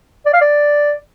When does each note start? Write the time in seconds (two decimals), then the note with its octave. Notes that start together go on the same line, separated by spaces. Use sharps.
0.26 D5
0.34 F5
0.42 D5